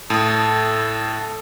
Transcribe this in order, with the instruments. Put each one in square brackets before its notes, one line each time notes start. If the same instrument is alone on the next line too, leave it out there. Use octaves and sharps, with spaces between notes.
[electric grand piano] A2 [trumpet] A4 [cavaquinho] A5 D#6